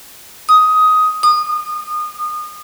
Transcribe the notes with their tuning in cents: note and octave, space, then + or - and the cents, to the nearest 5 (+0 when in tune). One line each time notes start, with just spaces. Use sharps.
D#6 +15
D#6 -30